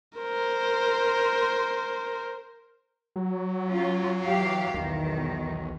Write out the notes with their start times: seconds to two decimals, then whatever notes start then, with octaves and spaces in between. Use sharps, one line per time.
0.19 A#4 C5
3.16 F#3
3.68 C#4 F4
4.24 E3 G4 F5
4.74 B1 E2 D#3